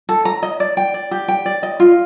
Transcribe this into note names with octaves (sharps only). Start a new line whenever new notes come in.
A4
A#5
D#5
D5
G5
D5
G4
G5
D5
D#5
F4